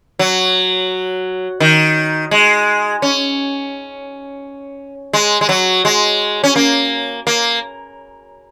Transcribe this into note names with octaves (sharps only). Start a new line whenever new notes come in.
F#3
D#3
G#3
C#4
G#3
G#3
F#3
G#3
C#4
A#3
A#3